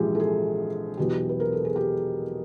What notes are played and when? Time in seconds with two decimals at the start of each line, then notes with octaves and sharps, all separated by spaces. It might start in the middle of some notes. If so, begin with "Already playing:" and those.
Already playing: A#1 G#2 E3 F4 G4 G#4
0.15 A4
0.20 G#4
0.97 E2 B2 F#3 G4
1.29 B4
1.40 A#4
1.53 A4
1.65 G#4
1.76 G4